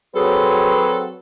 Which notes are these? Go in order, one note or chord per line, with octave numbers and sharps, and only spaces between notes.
F#3 C4 G#4 A4 B4